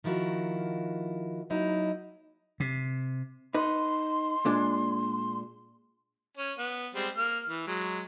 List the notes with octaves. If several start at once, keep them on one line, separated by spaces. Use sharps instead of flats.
D#3 F3 E4 F#4 A#4
F#3 A#3 D#4 E4
C3
D#4 B4 C6
A#2 G#3 D4
C#4
B3
G3 G#3 C4
A#3 F6
E3
F#3 G#3